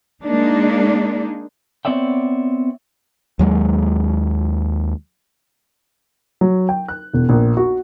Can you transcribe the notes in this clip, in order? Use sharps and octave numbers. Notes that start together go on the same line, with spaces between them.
G#3 A#3 D4 D#4
B3 C4 C#5 D5 E5 G5
D#2 F#3 G#3
F#3
G5
F#6
E1
A#1
F#4